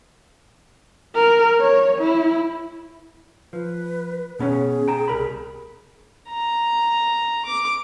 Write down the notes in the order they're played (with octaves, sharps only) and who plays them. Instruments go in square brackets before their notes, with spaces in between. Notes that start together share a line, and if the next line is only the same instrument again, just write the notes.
[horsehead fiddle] A#4
C#5
E4
[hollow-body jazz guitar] F3 [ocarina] B4
[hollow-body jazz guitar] B2 B3 C#4 [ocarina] G#4
[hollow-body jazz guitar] G5 A#5
C2 A#4 B5
[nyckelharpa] A#5
D6